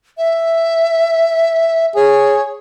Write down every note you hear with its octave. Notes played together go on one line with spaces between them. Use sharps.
E5
G#4 C#5